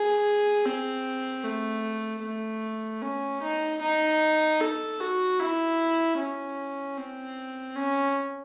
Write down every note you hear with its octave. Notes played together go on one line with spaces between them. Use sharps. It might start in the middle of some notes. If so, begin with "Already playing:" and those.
Already playing: G#4
C4
A3
A3
C#4
D#4
D#4
A4
F#4
E4
C#4
C4
C#4